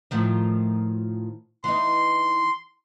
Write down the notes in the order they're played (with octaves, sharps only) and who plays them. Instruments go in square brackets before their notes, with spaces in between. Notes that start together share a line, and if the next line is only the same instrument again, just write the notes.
[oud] A2 D#3 F3
[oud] E3 D#4 [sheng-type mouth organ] C6